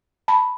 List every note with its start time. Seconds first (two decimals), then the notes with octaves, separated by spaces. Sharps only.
0.28 A5 B5